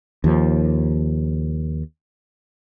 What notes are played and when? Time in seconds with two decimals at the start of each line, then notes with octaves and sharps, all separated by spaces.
0.24 D#2 F3